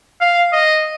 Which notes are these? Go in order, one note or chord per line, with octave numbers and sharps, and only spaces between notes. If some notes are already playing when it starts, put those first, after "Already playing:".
F5
D#5